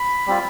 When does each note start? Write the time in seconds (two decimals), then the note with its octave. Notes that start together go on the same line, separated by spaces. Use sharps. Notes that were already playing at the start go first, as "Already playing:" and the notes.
Already playing: B5
0.26 G3 C4 F4